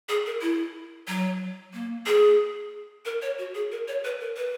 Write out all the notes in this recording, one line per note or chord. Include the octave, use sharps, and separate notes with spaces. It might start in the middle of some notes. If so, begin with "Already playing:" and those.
G#4
A#4
E4
F#3
A#3
G#4
A#4
C#5
F#4
G#4
A#4
C#5
B4
A#4
B4